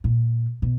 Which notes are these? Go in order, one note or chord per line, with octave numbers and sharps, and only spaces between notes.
A#2
B2